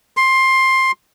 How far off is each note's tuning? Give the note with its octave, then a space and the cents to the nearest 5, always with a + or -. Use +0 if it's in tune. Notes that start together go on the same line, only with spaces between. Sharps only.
C6 +15